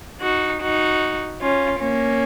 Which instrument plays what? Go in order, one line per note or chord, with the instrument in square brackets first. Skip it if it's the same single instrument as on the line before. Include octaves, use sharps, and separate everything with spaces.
[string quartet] D#4 F#4
D#4 F#4
C#4 F4
A#3 C#4